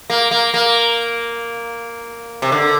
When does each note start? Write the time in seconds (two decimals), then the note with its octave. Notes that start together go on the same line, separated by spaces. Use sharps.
0.10 A#3
0.31 A#3
0.54 A#3
2.42 C3
2.52 D3